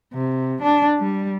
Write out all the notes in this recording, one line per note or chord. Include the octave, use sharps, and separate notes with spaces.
C3
D4
G3